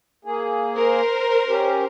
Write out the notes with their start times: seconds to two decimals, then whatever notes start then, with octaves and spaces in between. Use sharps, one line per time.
0.25 A#3 G#4
0.75 A#4 C5
1.49 C#4 G4